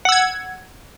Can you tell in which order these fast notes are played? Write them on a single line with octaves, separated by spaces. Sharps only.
F#5 E6 G#6